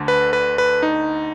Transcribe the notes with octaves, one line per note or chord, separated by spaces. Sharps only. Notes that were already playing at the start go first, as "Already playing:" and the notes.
Already playing: D2 D3
B4
B4
B4
D#4